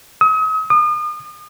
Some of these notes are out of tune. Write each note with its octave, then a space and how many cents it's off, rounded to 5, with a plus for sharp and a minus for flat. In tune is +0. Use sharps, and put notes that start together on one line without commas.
D#6 +40
D#6 -40